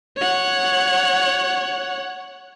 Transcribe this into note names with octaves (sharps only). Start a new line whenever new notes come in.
C#5 F#5